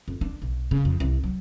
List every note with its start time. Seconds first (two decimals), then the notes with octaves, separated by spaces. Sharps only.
0.08 F2
0.21 D4
0.42 B1
0.71 C#3
0.85 F2
1.00 C2
1.24 F#3